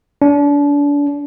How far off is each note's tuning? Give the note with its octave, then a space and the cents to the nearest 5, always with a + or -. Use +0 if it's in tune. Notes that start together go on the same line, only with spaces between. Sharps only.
D4 -35